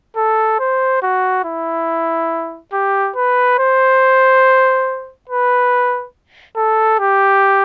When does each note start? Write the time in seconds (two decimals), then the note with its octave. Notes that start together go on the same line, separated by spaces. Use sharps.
0.17 A4
0.60 C5
1.03 F#4
1.45 E4
2.73 G4
3.16 B4
3.59 C5
5.30 B4
6.57 A4
6.99 G4